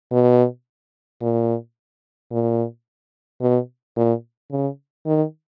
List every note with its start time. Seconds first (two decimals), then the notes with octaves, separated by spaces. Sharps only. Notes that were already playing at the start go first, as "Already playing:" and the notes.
0.12 B2
1.21 A#2
2.31 A#2
3.41 B2
3.96 A#2
4.51 C#3
5.06 D#3